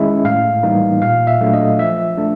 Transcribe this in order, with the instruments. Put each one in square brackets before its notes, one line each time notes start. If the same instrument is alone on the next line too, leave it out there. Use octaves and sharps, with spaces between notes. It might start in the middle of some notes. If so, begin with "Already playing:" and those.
Already playing: [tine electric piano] D#3 G#3 C#4 E4 E5
A2 F5
E3 G3 A#3 D#4
A#2 F5
E5
F#3 A3 D4
D#5
F3 E5
A3 D4